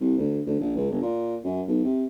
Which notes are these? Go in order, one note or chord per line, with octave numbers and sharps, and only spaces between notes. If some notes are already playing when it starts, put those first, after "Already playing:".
C2
D2
D2
A#1
C#2
G1
A#2
F#2
B1
C3